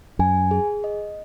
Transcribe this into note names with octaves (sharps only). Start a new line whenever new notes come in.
F#2 G#5
G#4
D#5